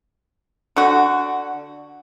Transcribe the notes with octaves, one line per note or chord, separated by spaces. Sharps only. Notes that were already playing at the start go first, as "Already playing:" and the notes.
D3 F#4